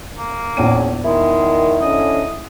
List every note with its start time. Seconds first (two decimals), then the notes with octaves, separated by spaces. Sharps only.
0.18 A#3
0.57 A#1 E2 C#4 D#7
1.05 D#3 G#3 E4 A#4
1.81 D3 C#4 D#5